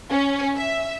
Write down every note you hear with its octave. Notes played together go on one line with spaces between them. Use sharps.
C#4
E5